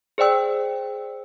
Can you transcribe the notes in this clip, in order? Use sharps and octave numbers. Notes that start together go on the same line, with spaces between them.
G#4 C5 D5 G5 E6